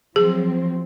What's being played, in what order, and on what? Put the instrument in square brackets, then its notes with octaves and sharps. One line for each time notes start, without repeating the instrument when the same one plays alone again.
[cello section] F3 F#3 C4 [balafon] G#4